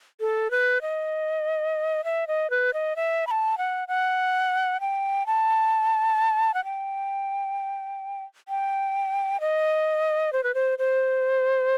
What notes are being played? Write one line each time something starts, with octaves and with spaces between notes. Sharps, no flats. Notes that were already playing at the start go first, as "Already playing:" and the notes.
A4
B4
D#5
E5
D#5
B4
D#5
E5
B5
A5
F#5
F#5
G5
A5
F#5
G5
G5
D#5
C5
B4
C5
C5